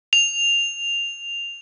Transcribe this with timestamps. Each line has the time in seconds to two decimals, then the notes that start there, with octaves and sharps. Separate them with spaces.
0.13 F7